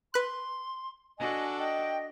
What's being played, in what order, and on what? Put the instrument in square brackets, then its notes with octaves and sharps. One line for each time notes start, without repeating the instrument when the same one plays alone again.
[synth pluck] B4 F#6 [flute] C6
[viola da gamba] D4 F#4 A4 [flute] D#5 [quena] G#5
[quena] D#5 [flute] G5